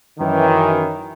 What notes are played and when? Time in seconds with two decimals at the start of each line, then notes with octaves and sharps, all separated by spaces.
0.19 F#2 D#3 E3